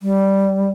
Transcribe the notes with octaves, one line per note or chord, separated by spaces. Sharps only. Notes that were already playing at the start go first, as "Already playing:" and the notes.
G3